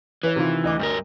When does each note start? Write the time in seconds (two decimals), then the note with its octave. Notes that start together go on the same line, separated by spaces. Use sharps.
0.23 E3 B4 C#5
0.36 C3 D#3 F4
0.64 D2 D#5 D6
0.80 G2 G3 A#4